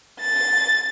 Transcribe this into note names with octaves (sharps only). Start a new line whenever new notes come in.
A6